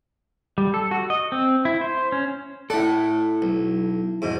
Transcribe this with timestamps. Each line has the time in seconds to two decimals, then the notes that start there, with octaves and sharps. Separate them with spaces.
0.58 G3
0.74 A4
0.91 F#4
1.10 D#5
1.32 C4
1.65 E4
1.81 C5
2.12 C#4
2.70 E4 A4 D5 F#5
3.42 B1
4.22 E2 G#2 B2